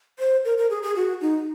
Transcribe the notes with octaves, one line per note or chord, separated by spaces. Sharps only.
C5
A#4
A#4
G#4
G#4
F#4
D#4